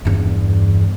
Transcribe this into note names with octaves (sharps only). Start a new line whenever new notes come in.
E2 G2